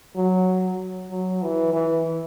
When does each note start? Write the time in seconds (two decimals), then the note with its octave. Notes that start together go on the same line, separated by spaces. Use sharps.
0.16 F#3
1.11 F#3
1.42 E3
1.73 E3